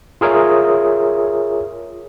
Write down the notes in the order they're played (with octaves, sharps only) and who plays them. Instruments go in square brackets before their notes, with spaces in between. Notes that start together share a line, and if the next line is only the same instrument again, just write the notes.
[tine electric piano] F4 G#4 A#4 C#5 E5 F5